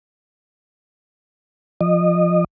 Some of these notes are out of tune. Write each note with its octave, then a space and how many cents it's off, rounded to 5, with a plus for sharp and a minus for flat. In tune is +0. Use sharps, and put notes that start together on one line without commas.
F3 +0 D#5 -25